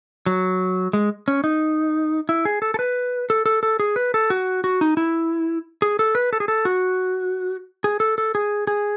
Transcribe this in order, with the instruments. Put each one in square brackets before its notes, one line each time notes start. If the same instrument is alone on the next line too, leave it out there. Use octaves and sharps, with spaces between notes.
[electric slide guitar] F#3
G#3
C#4
D#4
E4
G#4
A4
A4
B4
A4
A4
A4
G#4
B4
A4
F#4
F#4
D#4
E4
G#4
A4
B4
A4
G#4
A4
F#4
G#4
A4
A4
G#4
G#4